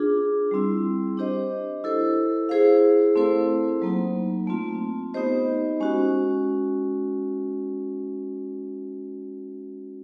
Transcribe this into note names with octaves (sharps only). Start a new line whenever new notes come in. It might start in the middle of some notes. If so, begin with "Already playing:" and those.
Already playing: D4 F4 G#4
G3 C4 E4
D4 G4 C5 D#5
E4 A4 C5
E4 G#4 C5 F5
A3 C4 E4 A4 C5
F#3 A#3 D#4
A3 C4 F4
B3 D#4 G4 C5 D#5
G#3 C#4 F#4